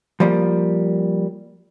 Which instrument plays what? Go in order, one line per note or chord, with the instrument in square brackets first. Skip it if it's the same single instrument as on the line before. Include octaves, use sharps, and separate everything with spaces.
[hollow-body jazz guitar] F3 G3 A#3